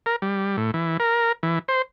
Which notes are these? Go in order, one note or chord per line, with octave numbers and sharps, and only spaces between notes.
A#4
G3
A2
E3
A#4
E3
C5